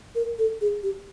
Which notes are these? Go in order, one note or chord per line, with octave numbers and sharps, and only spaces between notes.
A#4
A4
G#4
G4